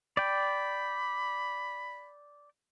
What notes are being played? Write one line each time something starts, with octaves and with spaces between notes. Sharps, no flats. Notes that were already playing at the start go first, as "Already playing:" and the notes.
D5 G5 B5